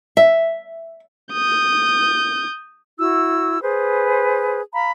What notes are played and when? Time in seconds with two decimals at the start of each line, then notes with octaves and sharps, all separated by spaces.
0.17 E5
1.33 D#6 G6
2.98 E4 F#4 E6
3.62 G#4 B4 C5
4.73 F5 A#5 B5